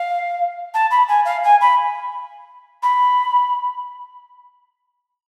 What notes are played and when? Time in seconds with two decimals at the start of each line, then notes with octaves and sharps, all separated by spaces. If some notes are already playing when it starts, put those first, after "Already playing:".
Already playing: F5
0.74 A5
0.90 B5
1.08 G#5
1.25 F5
1.43 G#5
1.61 B5
2.82 B5